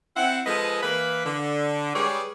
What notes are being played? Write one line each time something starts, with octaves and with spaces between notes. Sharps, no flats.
C4 E4 F#5
F3 G#3 G#4 A4 B4 D#5
E3 A#3 B4
D3
G3 G#3 G#4 B4 C#5 D5